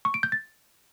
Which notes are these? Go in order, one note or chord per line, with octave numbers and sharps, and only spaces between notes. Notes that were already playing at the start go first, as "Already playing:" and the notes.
C#6
D7
G6
A6